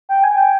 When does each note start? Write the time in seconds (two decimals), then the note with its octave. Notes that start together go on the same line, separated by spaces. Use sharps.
0.09 G5
0.24 G#5
0.38 G5